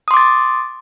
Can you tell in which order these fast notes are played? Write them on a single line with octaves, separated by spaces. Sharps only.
D#6 C6 D6 A6